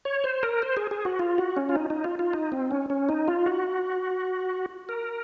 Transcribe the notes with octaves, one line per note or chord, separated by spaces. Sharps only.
C#5
C5
A#4
C5
G#4
G#4
F#4
F4
F#4
C#4
F4
D#4
D#4
F4
F4
D#4
C4
C#4
C#4
D#4
F4
F#4
A#4